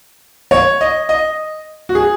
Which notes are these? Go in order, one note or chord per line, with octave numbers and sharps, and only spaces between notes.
C#5
D#5
D#5
F#4
G#4